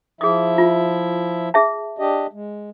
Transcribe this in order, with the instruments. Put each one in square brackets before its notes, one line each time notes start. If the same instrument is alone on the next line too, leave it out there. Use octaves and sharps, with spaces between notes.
[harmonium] F3 E4 E5 [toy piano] G#4 D#6
[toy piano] F4
G#4 E5 A5
[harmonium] D4 G4 D#5
G#3